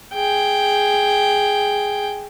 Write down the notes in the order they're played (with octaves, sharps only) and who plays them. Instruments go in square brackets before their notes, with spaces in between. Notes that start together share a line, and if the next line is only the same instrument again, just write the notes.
[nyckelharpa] G#4 G5